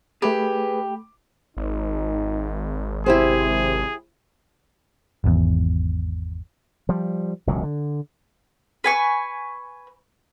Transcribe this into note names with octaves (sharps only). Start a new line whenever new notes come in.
A3 G4 G#4 B4 B5
G#1 D#4
C3 E4 G4 G#4 C5
G#1 E2
F3 G3
E1 C#2 A2 F#3
D3
B4 G#5 C#6